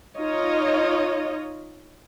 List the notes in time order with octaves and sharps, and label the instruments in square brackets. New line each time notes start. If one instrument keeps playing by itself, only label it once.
[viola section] D#4 F4 C#5 D#5